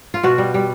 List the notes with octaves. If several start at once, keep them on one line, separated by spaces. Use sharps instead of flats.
F4
B2 F#4
G3
G3